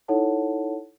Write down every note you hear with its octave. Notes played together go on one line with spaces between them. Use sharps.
D#4 E4 A4 C#5 F#5 A5